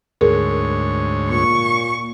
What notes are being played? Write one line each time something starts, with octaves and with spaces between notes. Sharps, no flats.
D2 G#2 G#4 A#4 C#5
A#2 C#6